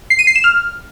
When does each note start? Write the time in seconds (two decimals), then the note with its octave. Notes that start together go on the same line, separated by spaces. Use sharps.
0.10 C7
0.19 D#7
0.27 C7
0.36 E7
0.44 F6